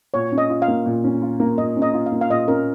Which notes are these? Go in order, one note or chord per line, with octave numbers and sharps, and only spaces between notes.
A#2 C#5
C#4
D#5
F4
F5
A#3
A#2
C#4
F4
A#3
A#2 D#5
C#4
D#5
F4
F5
A#3
F5
A#2 D#5
C#4 A#4